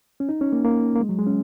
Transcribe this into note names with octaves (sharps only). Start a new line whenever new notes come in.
C#4
D#4
C#4
A#3
A#3
A#3
G#3
F#3
G#3
C#4